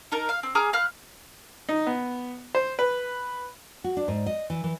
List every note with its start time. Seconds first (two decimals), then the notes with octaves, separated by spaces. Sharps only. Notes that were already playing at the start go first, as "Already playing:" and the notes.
0.12 D#4 A#4 A5
0.29 F5
0.43 C4
0.55 G#4 A#5 D6 F6
0.73 F5 B5 F6 F#6
1.69 D#4
1.87 B3
2.55 C5
2.79 B4
3.84 F#4
3.97 D4
4.08 G#2
4.26 D#5
4.50 E3
4.64 E3